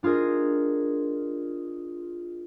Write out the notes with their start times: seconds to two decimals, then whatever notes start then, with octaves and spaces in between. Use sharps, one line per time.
0.03 D4 F4 G#4 A#4 D#5